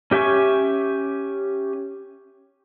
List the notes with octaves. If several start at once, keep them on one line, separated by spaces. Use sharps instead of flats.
C#4 G4 E5 G#5 C#6